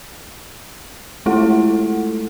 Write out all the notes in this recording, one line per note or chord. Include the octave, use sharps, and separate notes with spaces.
G#3 A3 E4 F4 A4 F#5